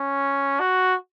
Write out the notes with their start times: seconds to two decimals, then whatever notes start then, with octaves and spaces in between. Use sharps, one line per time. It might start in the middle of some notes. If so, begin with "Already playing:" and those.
Already playing: C#4
0.60 F#4